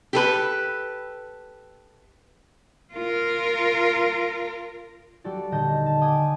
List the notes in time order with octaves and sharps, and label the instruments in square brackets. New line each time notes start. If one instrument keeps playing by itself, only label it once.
[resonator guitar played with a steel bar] G4 A4 B4
[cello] F4 A#4
[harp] G3 F#4 G4 A4 D5
D#1 D3 D#5 A5 G6
A5
G5 G#5 D6 D#6 G#6